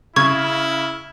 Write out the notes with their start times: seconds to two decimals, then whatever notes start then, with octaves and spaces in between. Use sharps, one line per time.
0.16 C#3 E4 C#6 G#6